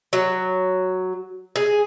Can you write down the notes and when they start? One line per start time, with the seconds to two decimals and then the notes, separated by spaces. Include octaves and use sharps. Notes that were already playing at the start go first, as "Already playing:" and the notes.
0.13 F#3
1.56 G#4